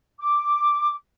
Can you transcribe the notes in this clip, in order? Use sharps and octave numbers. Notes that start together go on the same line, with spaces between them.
D6